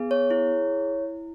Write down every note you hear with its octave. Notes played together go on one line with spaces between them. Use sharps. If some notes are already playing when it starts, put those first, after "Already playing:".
Already playing: B3 G#4
C#5
E4